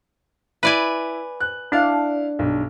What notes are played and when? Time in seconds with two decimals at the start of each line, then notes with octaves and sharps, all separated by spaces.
0.63 E4 B4 D5 G#5
1.40 F#6
1.72 D4 E4 F5
2.39 B1 G2